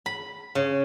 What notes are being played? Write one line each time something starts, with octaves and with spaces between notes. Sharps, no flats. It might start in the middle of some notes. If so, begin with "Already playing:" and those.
B5
C#3